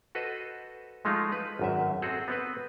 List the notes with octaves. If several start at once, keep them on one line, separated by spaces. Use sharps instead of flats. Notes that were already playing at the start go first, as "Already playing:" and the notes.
F#4 A4 B4 C5 D#5
F3 G#3 A3 D#4 F4
B4
G#1 F#2 E5
C4 F#4 G#4 A4
B3 C4 B4